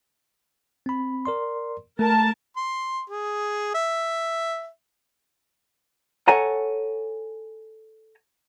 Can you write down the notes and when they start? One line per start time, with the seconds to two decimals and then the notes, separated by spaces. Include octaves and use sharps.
0.86 C4 B5
1.25 A#4 D5 C6
1.99 A3 A#4 A5
2.57 C6
3.10 G#4
3.74 E5
6.28 A4 C#5 F#5 G#5 A#5